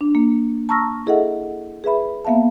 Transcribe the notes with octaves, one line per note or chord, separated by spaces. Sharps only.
D4
A#3
A5 A#5 C#6 E6 F6 A#6
E4 G#4 A4 D#5 E5 F#5
G#4 B4 E5 B5
A#3 B3 E5 F5 A5